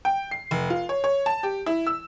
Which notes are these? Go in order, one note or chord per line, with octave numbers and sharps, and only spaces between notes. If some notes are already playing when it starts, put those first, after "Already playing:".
G5
C7
F1
F4
C#5
C#5
A5
G4
E4
E6